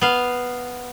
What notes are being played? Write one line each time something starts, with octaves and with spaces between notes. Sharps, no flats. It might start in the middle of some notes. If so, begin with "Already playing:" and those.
B3 F5